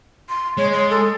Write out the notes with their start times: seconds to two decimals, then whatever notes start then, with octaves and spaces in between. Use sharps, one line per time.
0.29 C6
0.57 G#3 C#5
0.73 C6
0.90 A4